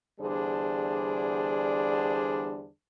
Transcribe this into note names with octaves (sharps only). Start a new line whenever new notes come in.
E2 D3 G3 D4 G#4 C5